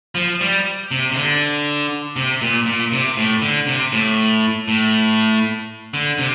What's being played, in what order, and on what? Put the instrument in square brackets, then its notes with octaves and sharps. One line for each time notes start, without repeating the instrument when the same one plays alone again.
[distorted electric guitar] F3
G3
C3
C3
D3
C3
A#2
A#2
C3
A2
D3
C3
A2
A2
D3
C3